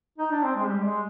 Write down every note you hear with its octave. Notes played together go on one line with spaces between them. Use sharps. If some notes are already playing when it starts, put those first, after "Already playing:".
D#4
D4
C4
G#3
G3
G#3